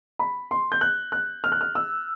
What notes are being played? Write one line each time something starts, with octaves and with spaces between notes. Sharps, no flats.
B5
C6
G6
F#6
F#6
F6
F#6
F6
E6